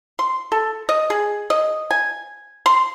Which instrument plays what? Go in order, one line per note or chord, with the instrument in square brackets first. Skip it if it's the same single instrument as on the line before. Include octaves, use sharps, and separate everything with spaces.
[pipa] C6
A4
D#5
G#4
D#5
G#5
C6